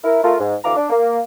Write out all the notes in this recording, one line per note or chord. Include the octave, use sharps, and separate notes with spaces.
E4 A#4
A3 F4 A#4
G#2
D2 E3 F5 A#5 D6
D4
A#3